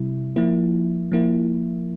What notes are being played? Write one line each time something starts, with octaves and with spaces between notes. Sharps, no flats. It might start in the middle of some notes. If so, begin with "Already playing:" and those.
Already playing: C3 G3 E4
F3 A#3 E4
F3 A#3 E4